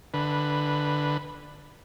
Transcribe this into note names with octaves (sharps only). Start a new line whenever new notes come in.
D3 B4